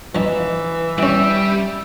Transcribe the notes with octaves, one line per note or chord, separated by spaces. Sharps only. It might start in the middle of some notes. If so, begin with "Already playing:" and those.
E3 F3 D#4
G3 C#4 E4 E5